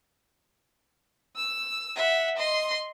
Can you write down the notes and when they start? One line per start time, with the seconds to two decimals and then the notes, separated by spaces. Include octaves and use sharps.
1.36 E6
1.96 E5 F#5
2.37 D#5 C6